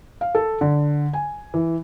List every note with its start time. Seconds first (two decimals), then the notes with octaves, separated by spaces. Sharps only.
0.21 F5
0.35 A4
0.61 D3
1.13 G#5
1.54 E3